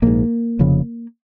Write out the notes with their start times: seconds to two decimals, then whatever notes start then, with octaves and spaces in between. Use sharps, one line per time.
0.02 A#1 G#2 A#3
0.59 F1 F2 C#3